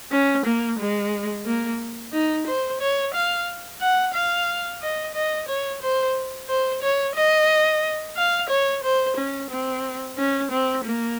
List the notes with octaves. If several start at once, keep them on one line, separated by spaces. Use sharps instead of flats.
C#4
A#3
G#3
A#3
D#4
C5
C#5
F5
F#5
F5
D#5
D#5
C#5
C5
C5
C#5
D#5
F5
C#5
C5
C#4
C4
C#4
C4
A#3